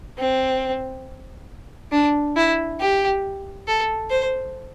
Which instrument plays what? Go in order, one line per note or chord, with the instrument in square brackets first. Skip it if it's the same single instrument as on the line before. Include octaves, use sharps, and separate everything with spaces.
[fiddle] C4
D4
E4
G4
A4
C5